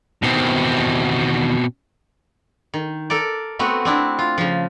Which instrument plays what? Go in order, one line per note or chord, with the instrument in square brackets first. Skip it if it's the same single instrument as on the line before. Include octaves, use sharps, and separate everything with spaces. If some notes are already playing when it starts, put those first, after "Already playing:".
[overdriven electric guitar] E2 D#3 [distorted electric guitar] B2 C4
[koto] D#3
A4 A#4 D5
A3 B3 C4 F#4
C4 D4 E4
F4
C#3 F3